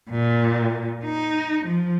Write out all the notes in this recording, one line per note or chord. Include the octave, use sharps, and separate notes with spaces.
A#2
D#4
F3